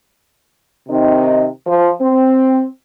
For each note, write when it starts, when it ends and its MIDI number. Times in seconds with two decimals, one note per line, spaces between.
0.89 1.46 48
0.89 1.46 51
0.89 1.46 60
0.89 1.46 63
1.67 1.91 53
2.00 2.65 60